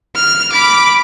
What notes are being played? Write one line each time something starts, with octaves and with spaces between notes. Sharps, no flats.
F6
B5 D6